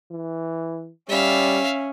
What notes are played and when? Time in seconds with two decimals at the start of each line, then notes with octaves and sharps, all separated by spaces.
0.11 E3
1.09 G3 C#4 E5 F5